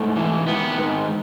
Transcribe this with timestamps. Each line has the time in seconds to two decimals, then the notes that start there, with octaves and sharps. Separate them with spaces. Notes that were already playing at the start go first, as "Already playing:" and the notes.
Already playing: G#2 A3
0.16 E3
0.48 D#3 B3
0.78 G#2